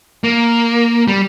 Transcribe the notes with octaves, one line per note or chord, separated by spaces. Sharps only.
A#3
G3